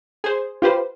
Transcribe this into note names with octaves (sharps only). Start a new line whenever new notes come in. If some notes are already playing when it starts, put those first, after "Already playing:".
G#4 C5
F4 G4 B4 C5